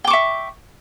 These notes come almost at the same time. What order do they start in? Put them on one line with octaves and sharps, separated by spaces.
G5 D6 C#6 E5